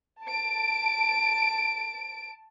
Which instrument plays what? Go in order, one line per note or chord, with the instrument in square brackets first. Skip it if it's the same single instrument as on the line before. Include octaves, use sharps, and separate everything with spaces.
[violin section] A5 D7